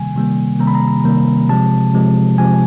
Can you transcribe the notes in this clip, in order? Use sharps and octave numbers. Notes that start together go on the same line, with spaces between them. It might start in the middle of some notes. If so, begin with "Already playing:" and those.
Already playing: C3 D#3 G3 A#3 G#5
C3 D#3 G3 A#3
C3 D#3 G3 A#3 A#5
B5
A#5
C3 D#3 G3 A#3
C3 F3 G#3 A5
C3 F3 G#3
C3 F3 G#3 G#5